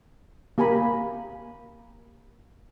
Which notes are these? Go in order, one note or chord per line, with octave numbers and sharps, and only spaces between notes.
A#3 G4 G#5 A#5 B5